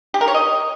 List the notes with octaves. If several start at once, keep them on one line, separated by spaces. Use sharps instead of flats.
G4
A#4
C#5
D#5